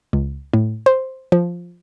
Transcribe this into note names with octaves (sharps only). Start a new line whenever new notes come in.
C#2
A2
C5
F3